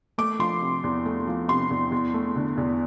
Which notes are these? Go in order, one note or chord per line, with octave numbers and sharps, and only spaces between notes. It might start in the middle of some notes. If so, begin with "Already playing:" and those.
A3 D6
F3 C6
C3
E2
A3
F3
C3 C6
E2
E2
A3
D3
E2